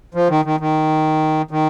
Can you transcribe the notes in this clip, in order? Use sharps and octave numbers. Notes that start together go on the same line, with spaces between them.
F3
D#3
D#3
D#3
D#3